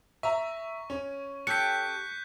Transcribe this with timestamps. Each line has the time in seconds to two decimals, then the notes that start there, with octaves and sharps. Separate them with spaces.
0.23 E5 A#5 C#6
0.90 C#4
1.47 G4 A4 F#6 G6 B6 C#7